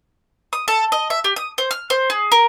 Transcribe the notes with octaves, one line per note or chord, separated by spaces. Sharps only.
D#6
A4
D#5
E5
G4
D#6
C5
F6
C5
G#4
A#4